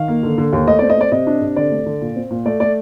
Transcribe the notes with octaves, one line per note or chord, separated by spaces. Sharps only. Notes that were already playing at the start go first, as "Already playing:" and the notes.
Already playing: D#3 F5
A#3
D3
D3
D#2
A3 D#5
D5
C4
D#5
C4 D5
C3 D#5
D4
C3
D3 D5
A3
D3
A#2
C4
A#2
A3 D5
A3 D5